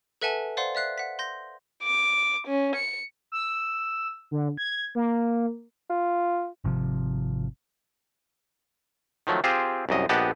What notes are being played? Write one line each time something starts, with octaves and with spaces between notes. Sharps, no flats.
A4 B4 E5 F#5 G#5 A5
C5 D5 F5 F#5 C6
D5 E5 F#6 C7
F#5 B6
C6 G6 A#6
D6
C#4
C#7
E6
D3
G#6
A#3
F4
G#1 C3 F3
D#3 F3 F#3 A3
C4 F4 G4 G#4 C5
C2 F#2 D#5
A#1 B3 G4 D#5 F#5 A5